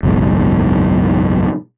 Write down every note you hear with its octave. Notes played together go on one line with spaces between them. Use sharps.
F#1 B1 E2 G#2